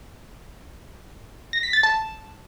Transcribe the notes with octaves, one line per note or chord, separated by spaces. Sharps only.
A#6
B6
A6
A5